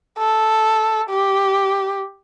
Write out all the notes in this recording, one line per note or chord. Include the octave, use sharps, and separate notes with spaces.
A4
G4